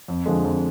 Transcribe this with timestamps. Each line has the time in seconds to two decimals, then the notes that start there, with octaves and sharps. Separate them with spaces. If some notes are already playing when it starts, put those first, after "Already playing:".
0.08 F2
0.26 D3 F3 G#3
0.44 F2